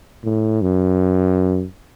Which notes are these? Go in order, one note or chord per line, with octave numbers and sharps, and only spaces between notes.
A2
F#2